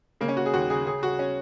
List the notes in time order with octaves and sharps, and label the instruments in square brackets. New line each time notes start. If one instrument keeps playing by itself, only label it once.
[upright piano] C#3 A#3
C#4
C#3 F#4
G#4
D#2 F#4
C#3 G#4
C#3 G#4
C#3 F#4
C#4